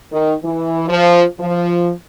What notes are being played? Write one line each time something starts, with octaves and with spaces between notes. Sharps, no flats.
D#3
E3
F3
F3